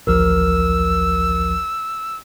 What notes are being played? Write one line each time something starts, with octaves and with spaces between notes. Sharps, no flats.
A1 D2 F3 A#4 E6 F6